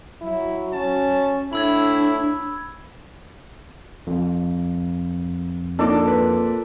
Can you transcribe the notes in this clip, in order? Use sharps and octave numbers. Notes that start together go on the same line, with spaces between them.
F#3 E4
C#4 A5
A2 D4 E4 B5 E6 G#6
F2
A#2 D4 D#4 A4 D6
B4